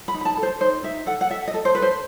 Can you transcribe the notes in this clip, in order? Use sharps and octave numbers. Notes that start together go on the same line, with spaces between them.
B5
D#4
B5
A5
A4
C5
D#4 C5
D#4 E5
A4 F#5
F#5
A4 E5
D#5
A4
C5
A4 B4
C5